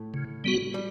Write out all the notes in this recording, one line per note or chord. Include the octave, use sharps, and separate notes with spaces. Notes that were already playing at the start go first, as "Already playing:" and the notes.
Already playing: A2 A3
C#3
G3 B3 F#4
G3